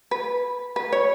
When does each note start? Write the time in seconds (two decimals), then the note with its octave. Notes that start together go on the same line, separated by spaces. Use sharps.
0.11 B4
0.76 B4
0.93 C#5